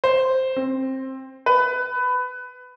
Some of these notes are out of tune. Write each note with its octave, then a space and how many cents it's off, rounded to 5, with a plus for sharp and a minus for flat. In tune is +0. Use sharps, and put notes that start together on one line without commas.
C5 +0
C4 +15
B4 +15